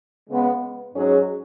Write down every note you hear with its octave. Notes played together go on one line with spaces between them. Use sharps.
C#3 G#3 B3
G#2 F#3 C#4 G#4